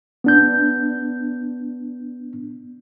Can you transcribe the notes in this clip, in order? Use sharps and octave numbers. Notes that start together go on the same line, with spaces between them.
B3 D4 G6